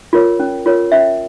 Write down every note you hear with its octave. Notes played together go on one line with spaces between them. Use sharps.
F4 A#4 C#5
C#4
F4 A#4 C#5
C#4 E5